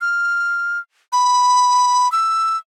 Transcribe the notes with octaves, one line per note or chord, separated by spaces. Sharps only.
F6
B5
E6